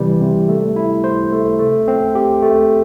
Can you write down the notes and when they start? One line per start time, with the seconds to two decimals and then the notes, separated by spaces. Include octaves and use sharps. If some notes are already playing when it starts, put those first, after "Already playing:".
Already playing: C3 E3 G3
0.21 C3
0.49 A3
0.76 E4
1.04 C5
1.33 A3
1.59 A3
1.88 C4
2.15 G4
2.42 A3